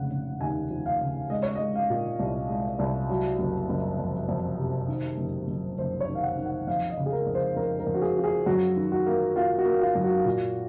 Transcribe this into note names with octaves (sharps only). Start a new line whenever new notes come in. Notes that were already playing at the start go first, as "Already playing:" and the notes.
Already playing: F1 C#3 F#5
C#3
D#2 G#5
F3
F5
C#3
G#3 D#5
C#5
G#3 D#5
F5
A#2
C2
G#3
C2
F#3
F#1
F#1
F2
F2
C3
D#3
F#1
F#1
F#1 C5
C#5
D#3
F5
F#5
D#3
F#5
F2 F5
D#5
C#3
G#4
A#4
F2
C5
F2 A#4
A#4
F2
F#4
G#4
F3
G#4
F#2 F#4
D#3
F#4
A#3
A#3 F4
F#4
A#3
F4
F#2
F#4
A#2